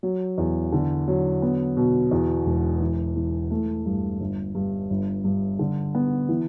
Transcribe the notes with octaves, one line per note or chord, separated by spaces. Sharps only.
F#3
E2
D3
F#3
B3
B2
E2
E1
E3
E3
A3
G2
G1
G2
G1
G2
D3
B3
E3